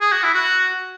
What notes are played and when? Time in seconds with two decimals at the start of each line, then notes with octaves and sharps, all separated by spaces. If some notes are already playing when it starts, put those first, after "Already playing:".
0.01 G#4
0.12 F#4
0.23 E4
0.34 F#4